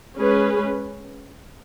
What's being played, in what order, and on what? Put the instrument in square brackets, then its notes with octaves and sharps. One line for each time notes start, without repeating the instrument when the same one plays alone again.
[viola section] G#3 C#4 G#4 B4